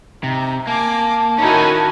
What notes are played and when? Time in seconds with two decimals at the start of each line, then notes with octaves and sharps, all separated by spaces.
0.24 C3 D#4
0.67 A#3 G#5 A5 D6
1.38 D#3 C#4 D#4 E4 F#4 A4 G#5